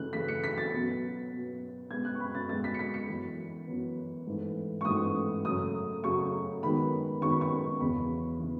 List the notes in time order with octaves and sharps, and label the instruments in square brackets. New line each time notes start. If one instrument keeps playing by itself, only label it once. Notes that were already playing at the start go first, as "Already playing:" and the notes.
Already playing: [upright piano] C#3 E3 A3 F#6
C#3 E3 A3 B6
C#7
B6
A6
B2 F#3 B3
B2 F#3 B3
B2 G#3 B3 G#6
F#6
C#6
B5
A6
B2 G#3 B3 A6
B6
C#7
B6
C#7
F#2 E3 B3
F#2 E3 B3
G#2 E3 A3
C#6
G#2 E3 A3 D#6
F#2 C#3 F#3 A3 D#6
F#2 C#3 F#3 A3 C#6
F#2 D#3 G#3 B3 B5
F#2 D#3 G#3 B3 C#6
B5
C#6
E2 C#3 E3 B5
C#3 E3